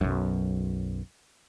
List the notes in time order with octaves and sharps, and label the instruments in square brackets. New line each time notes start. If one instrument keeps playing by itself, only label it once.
[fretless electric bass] B1 F#2